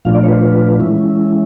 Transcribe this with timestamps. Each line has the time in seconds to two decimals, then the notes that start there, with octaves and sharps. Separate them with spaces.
0.05 A#2 F3 A3 D4 F4 F5
0.15 D5
0.23 C#5
0.28 B4
0.33 C5
0.42 B4
0.80 E3 G#3 C#4 E4